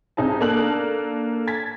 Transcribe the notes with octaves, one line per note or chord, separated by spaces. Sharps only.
C2 D#4 G#4 A5
A#3 D4 A4 F#6 F#7
G#6 A6 B6